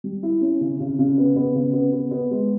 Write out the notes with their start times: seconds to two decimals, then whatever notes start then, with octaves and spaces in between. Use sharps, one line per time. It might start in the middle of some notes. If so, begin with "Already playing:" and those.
0.04 G3
0.23 E4
0.41 C#4
0.61 C#3
0.80 C#3
0.99 C#3
1.18 B3
1.36 B3
1.55 C#3
1.73 B3
1.92 B3
2.11 B3
2.31 G#3